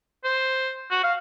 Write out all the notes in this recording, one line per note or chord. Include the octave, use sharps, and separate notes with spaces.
C5
F#4
F5